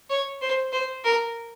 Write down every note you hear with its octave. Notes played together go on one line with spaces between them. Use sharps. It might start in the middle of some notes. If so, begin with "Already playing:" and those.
C#5
C5
C5
A#4